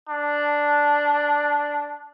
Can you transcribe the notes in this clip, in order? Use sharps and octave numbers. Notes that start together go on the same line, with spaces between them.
D4